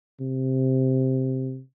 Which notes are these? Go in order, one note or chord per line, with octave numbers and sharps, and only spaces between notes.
C3